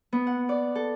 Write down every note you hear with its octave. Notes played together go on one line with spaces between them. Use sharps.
B3
F#5
D5
A4